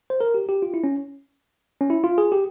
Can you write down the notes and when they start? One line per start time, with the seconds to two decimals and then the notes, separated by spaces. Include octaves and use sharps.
0.10 C5
0.21 A#4
0.34 G4
0.49 G4
0.62 F4
0.74 E4
0.84 C#4
1.81 C#4
1.90 E4
2.04 F4
2.18 G#4
2.32 G4